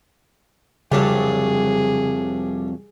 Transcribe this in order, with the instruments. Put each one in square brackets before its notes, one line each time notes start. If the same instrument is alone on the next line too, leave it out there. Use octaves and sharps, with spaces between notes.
[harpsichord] C2 D4 A5 [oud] F2 F#3 G3 [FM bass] C#3 [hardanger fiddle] G#4